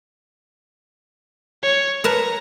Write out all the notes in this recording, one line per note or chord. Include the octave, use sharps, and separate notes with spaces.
C#5
A#4 B4 A5 A#5